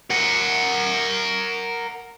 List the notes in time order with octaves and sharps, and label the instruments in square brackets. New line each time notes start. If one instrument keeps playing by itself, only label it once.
[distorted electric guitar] A#4 F#5